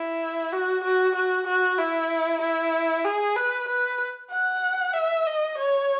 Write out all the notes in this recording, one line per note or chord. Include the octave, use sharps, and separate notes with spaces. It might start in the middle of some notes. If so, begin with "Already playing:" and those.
Already playing: E4
F#4
F#4
F#4
F#4
E4
E4
G#4
B4
B4
F#5
E5
D#5
C#5